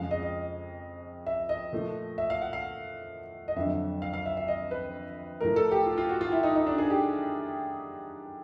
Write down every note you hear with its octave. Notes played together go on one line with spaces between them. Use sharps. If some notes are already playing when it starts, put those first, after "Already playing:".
Already playing: F2 C#3 F3 G#3 F5
D#5
D#5
E5
D#5
A#2 F3 A3
E5
F5
F#5
F5
D#5
F2 D3 F#3 E5
F5
F5
E5
E5
D#5
B4
A2 F3 A3 A#4
A4
G4
F4
F4
F#4
F4
E4
D#4
D#4
D4
G#4
G4